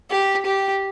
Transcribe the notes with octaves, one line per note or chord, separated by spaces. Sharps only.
G4
G4